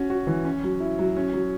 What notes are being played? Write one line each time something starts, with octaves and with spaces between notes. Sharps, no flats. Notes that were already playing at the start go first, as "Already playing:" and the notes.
Already playing: C#4 F#4
F#4
E3
C#4
F#3
E4
F#3
C#4
F#3